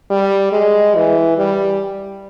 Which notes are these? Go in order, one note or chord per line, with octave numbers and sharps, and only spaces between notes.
G3
G#3
E3
G3